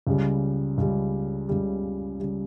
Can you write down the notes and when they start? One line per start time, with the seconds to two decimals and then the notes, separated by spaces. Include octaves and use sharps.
0.07 C#2 C#3 G3
0.78 C#2 C#3 G3
1.48 C#2 C#3 G3
2.20 C#3 G3